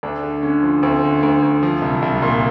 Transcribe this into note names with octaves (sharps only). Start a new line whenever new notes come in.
D2 D4
D3
D3 C#4
F3
D2 C4
D3
D2
D2
F3
C2
C2
A#2